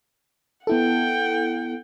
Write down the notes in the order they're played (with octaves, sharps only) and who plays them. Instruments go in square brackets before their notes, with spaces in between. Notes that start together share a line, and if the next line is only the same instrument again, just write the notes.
[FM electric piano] B3 E4 A4 [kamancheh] F#5 G5